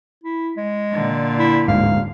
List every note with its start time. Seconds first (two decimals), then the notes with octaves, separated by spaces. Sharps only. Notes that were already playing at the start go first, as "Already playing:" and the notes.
0.24 E4
0.57 G#3
0.92 A#2 D3
1.39 E4
1.68 D1 G#2 F5